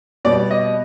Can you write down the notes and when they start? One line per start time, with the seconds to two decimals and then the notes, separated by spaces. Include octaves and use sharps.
0.25 B2 G3 D5
0.51 D#5